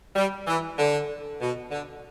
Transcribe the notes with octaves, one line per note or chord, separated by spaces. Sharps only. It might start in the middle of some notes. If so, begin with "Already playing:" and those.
G3
E3
D3
B2
D3